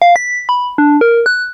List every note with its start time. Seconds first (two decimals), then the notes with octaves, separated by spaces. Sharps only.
0.02 F5
0.16 B6
0.49 B5
0.78 D4
1.01 A#4
1.26 F#6